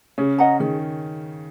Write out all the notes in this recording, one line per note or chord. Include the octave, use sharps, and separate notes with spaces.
C#3 C#4 G#4
D#5 F#5 A#5
D#3 G#4